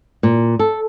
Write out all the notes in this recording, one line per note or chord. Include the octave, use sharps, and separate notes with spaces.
A#2
A4